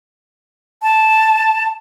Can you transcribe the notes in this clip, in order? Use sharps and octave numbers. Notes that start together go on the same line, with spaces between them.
A5